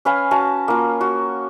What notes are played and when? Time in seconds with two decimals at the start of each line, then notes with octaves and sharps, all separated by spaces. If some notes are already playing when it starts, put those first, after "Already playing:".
0.05 C#4 B4 F5 G#5
0.31 C#4 F#4 A5
0.68 A#3 F4
1.01 F#4